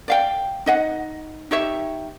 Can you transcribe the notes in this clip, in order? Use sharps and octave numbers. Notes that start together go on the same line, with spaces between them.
D5 F5 G5
D#4 D#5 F#5
D#4 G4 C#5 E5